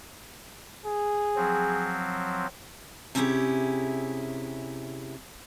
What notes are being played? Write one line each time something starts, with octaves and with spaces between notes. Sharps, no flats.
G#4
F3 F#3 C4
C3 C#4 E4 F4 G4 G#4